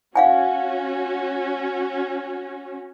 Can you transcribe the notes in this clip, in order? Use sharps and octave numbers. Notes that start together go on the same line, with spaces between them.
C#4 F#4 F5 F#5 G#5